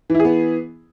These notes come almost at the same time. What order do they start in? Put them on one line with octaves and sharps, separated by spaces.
E3 E4 G#4 B3